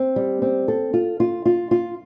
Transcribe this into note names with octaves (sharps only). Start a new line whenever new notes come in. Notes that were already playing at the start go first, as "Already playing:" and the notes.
Already playing: C4
G3
C4
A4
F4
F4
F4
F4